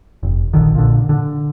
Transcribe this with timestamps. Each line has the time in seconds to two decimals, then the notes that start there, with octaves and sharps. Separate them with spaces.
0.23 F1
0.53 A#1 D3 D#3
0.75 A#2 D3
1.09 D3